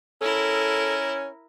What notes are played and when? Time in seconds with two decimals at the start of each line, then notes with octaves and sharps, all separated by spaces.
0.21 C#4 E4 A4 A#4